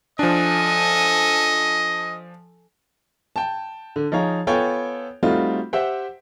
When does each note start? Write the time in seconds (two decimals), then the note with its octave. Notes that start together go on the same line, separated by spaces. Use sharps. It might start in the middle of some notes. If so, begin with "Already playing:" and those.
0.19 F3 D4 A4 D#5 G#5
3.36 G5 A5
3.96 D3
4.12 F3 D#4 G#4 C#5 F5 A#5
4.47 B3 F4 A4 C#5 G5 G#5
5.23 G3 A3 C4 D#4 F4 F#4
5.73 G4 C5 E5 F#5 G5